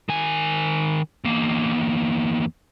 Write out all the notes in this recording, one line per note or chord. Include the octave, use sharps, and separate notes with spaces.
D#3 G#5
E2 A#3